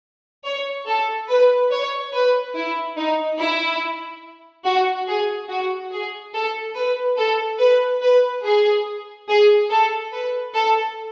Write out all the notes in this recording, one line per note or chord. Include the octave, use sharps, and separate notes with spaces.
C#5
A4
B4
C#5
B4
E4
D#4
E4
F#4
G#4
F#4
G#4
A4
B4
A4
B4
B4
G#4
G#4
A4
B4
A4